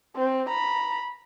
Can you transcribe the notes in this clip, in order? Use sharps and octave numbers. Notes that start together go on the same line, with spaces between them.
C4
A#5 B5